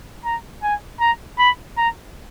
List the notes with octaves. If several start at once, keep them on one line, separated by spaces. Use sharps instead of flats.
A#5
G#5
A#5
B5
A#5